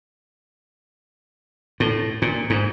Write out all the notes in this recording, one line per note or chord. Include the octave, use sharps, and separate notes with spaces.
A2
A#2
G#2